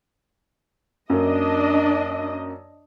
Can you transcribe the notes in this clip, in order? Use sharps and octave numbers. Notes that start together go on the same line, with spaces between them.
F#2 A#3 D4 D#5